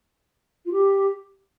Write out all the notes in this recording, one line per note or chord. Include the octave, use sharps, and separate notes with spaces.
F4
G4